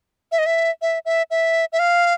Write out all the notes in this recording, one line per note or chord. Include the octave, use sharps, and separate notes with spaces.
E5
D#5
E5
E5
E5
E5
E5
F5